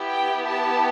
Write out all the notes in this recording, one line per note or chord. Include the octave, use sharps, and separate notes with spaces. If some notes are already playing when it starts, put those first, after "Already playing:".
Already playing: B3 E4 G4
G5
A5